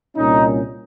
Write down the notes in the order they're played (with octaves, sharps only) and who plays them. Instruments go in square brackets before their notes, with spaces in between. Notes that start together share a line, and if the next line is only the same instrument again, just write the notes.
[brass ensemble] C2 A#2 G3 C#4 D#4